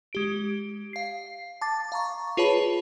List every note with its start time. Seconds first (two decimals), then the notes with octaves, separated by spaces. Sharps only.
0.13 G#3 G4 D7
0.93 F5 C7
1.61 A5 D6 A6
1.92 F5 A#5 C#6
2.37 F4 G#4 B4 C#5 A5 B5